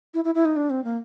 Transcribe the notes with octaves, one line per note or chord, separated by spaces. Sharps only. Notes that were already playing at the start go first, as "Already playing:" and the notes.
E4
E4
E4
D#4
D4
C4
A#3